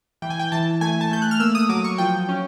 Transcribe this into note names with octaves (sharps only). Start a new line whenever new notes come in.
E3 G5
G#5
G5
E3 A5
A3 G#5
A5
A3 G6
F#6
F6
A#3 E6
D#6
F#3 D6
C#6
F3 G5
C#4